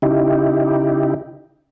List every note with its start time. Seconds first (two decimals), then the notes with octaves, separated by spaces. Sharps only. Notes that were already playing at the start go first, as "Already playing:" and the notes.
0.02 C#3 D#4 E4 G4